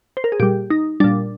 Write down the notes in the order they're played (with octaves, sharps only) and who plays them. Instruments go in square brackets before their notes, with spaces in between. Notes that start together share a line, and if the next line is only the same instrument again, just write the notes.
[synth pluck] C5
A#4
G#4
A#2 G3 G4
D#4
A#2 G3 D4